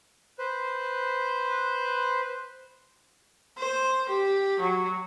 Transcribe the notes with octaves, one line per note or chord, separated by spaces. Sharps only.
B4 C5
C5
G4
F#3